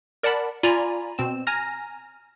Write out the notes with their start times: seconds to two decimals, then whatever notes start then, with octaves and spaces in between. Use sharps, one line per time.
0.23 A#4 D5 F#5 A5 B5
0.63 F4 D5 G#5 A#5 B5
1.18 B2 C4 E7
1.47 G#5 A#5 F6 A#6